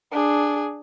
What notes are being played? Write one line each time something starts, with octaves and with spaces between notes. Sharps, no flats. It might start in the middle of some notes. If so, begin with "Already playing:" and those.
D4 G#4